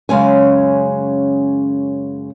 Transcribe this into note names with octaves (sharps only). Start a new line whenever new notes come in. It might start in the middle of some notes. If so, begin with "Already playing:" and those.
F#2 C#3 G#3 C#4 G#5